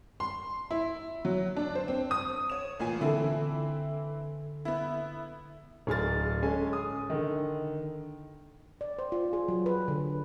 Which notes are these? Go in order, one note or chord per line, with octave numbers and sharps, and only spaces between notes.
C6
E4
F#3
D4
C5
C4
D#6
C#5 E7
A1 A#2 G#5
D3 E3 C4 E4 A4
B3 E4
D1 G#4 F6 A6
G#3 C#4 A4 G#5
D#6
D3 D#3
D5
C5
F4
G#4
F#3
B4
D3